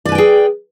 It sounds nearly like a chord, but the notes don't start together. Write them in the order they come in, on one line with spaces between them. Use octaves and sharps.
D5 B4 G#5 G5 G#4